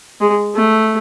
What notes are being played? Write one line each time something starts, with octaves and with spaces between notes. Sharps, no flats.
G#3
A3